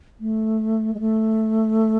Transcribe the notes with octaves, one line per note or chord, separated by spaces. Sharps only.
A3
G#3
A3